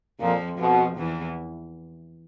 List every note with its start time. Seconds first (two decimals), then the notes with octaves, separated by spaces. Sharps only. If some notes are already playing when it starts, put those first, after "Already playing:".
0.20 F2 A#2 F3
0.58 F2 B2 F3
0.97 E2 E3